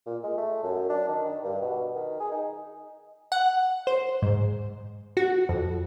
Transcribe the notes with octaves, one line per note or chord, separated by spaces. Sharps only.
A#2
G#3
A3
F#2
D4
D#3
D#3
G2
B2
D#3
G#4
D#4
F#5
C5
G#2
F#4
F2